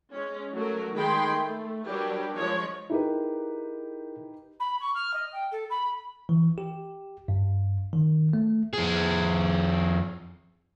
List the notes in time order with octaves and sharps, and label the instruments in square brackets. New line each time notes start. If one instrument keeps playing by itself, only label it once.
[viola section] G#3 C#4
F#3 A3 F#4 A#4
D#3 G#3 G#4 G5 B5 C6
A3
F#3 G3 D4 G4 A#4 B4
F3 G#3 C#5
[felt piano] D#4 G4 B4 [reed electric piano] E4 G#4 A#4
[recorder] B5
C#6
F6
D#5
G5
A4
B5
[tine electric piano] E3
G4
G2
D#3
A3
[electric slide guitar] F2 G#4